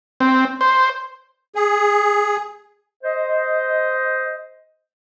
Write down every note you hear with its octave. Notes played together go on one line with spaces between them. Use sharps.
C4
C5
G#4
C5 D#5